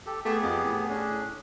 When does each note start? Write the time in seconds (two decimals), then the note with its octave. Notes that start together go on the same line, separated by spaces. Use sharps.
0.06 G4 A4
0.25 A3 B3 G4 G#4
0.43 F2
0.64 A2
0.89 C#4 D4 G#4